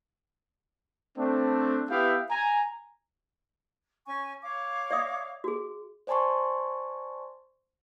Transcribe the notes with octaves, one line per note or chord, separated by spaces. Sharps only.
A3 C4 D4
B3 E4 G4 E5 F5 G5
G#5 A#5
C#4 G#5 C#6
C#5 F5 D6
D5 E5 D#6
F#4 G#4
C5 D5 G#5 A5 C6 C#6